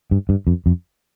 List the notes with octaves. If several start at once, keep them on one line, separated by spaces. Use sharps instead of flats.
G2
G2
F2
F2